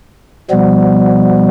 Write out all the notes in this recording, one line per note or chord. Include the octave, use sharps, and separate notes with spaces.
B2 F3 G3 B3